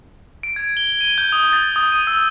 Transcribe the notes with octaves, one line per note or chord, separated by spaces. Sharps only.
D7
G#6
G7
D#7
G6
D#6
A6
D#6
D#7
E6